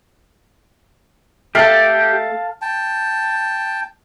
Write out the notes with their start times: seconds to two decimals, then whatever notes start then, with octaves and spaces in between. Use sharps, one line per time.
1.55 A3 G4 F5 A5
2.62 G5 A5